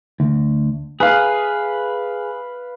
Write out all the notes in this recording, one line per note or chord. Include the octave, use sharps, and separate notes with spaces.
D2
G#4 B4 F5